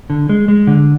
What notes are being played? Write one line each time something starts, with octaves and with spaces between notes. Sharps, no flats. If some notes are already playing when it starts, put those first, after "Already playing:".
D3
G#3
G#3
D3